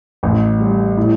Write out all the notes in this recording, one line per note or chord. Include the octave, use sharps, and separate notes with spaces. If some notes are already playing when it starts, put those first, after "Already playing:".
A1
G3
A2